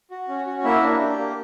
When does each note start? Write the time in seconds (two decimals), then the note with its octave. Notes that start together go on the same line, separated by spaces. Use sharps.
0.11 F#4
0.28 C#4
0.47 F#4
0.64 A#3 E4 E5
0.83 D4
1.00 G4
1.17 A#3